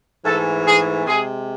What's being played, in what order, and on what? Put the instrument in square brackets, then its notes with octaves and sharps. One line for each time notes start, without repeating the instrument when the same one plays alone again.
[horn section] G#2 E3 A3 A4
G#4
C3 G#3 G#4